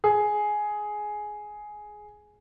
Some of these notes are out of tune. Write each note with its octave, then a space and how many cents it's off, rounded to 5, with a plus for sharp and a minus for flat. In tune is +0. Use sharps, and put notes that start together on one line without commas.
G#4 +10